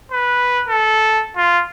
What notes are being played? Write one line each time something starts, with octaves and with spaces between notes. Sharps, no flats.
B4
A4
F4